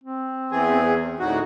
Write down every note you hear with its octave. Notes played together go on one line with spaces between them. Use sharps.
C4
E2 E3 G#4
D2 A2 D#4 F#4